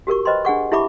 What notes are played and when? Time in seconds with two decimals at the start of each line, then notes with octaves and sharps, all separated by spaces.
0.07 F#4 G4 A#4 C#6
0.25 B4 C5 D#5 G5 B5 C6
0.45 D4 G#4 F#5 C#6
0.72 E4 G4 E5 B5 C#6 D6